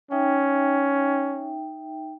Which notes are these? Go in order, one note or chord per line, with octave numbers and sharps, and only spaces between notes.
C#4 D#4 E5 G5